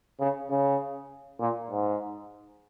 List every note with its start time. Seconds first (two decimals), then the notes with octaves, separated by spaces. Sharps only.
0.20 C#3
0.50 C#3
1.40 A#2
1.70 G#2